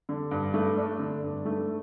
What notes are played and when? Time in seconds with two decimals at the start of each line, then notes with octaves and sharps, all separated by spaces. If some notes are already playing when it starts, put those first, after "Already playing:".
0.09 D3
0.31 G2
0.54 A3
0.78 D4
0.99 D3
1.23 G2
1.45 A3